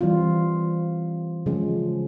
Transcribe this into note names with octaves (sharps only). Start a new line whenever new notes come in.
E3 G3 C4 F4
C#3 F3 G#3